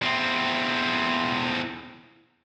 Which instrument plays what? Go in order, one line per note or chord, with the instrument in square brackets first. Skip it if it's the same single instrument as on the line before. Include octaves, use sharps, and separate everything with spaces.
[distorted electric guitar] E2 C4